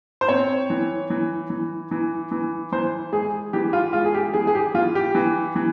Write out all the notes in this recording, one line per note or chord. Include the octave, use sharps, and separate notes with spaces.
C5
C4 C#5
E3
E3
E3
E3
E3
E3 C5
G#3 G#4
E3 G4
F4
G#3 F4
G#4
G4
E3 G#4
G#4
G4
E3 F4
G4
E3
E3